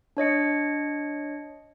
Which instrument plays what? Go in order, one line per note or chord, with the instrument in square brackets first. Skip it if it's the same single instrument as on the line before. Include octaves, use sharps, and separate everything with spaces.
[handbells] D4 C#5 D#5 C#7